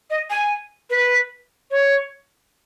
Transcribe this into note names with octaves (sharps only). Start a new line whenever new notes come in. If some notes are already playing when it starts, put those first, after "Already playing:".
D#5
G#5
B4
C#5